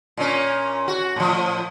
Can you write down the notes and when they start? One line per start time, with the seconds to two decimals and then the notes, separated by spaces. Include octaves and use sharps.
0.17 A#2 C#4
0.88 F#4
1.16 A2 F3